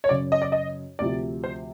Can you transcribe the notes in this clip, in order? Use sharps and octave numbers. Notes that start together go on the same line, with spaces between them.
C#5
F#2 C#3 F#3 D5
D#5
D5
D#5
D2 C3 F3 D5
C5